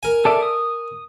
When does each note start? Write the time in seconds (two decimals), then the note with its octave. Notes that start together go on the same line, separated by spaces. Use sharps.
0.03 A#4 G#5
0.25 A4 D5 E5
0.42 D#6